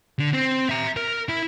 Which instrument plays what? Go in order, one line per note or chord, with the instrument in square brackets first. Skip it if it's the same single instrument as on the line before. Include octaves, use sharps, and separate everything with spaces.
[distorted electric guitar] D3
C4
E5 A#5
A#4
E4